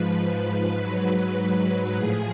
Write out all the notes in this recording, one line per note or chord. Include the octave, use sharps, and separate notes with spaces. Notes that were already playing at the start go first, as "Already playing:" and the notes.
Already playing: G#2 F3 B4
B4
G#2 F#3 B4
B4
A2 F3 G#4